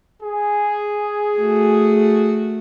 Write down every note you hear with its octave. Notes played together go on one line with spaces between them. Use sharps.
G#4
A3 F#4